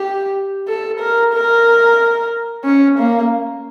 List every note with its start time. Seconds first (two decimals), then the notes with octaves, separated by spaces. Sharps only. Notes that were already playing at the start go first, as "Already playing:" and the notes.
Already playing: G4
0.68 A4
1.00 A#4
1.34 A#4
2.65 C#4
2.99 A#3